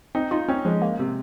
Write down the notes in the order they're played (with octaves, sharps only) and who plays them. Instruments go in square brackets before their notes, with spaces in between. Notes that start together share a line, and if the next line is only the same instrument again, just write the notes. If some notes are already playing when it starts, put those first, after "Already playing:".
[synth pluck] C4 [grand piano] D#4
[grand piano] D#4 [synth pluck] F4
[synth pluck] C4 [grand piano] C#4
[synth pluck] F3 [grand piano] G#3
[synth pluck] A#3
[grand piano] C3